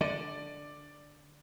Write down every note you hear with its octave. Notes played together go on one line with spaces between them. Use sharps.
D3 D5